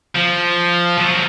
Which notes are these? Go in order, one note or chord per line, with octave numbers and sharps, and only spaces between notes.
F3
F3 F#3